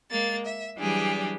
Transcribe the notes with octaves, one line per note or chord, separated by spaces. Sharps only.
G#3 A#3 A6
E5
E3 F#3 G3 D4 G4 G#4